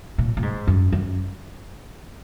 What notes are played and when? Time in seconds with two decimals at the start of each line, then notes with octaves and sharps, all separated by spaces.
0.18 A#2
0.37 A#2
0.42 G#2
0.67 F#2
0.92 F#2